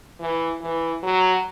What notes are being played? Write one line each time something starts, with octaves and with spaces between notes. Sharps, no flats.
E3
E3
F#3